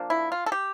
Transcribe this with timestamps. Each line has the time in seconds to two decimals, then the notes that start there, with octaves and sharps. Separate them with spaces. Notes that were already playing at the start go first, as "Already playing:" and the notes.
Already playing: F3 A#3 D4
0.10 E4
0.32 F4
0.46 A4
0.52 G4